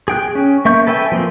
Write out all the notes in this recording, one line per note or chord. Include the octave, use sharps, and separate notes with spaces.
G#4 G5 F#6
C#4
A#3 E5 C#6 G6
A4 B4 E5 G5 G#5
F3 A#3 C4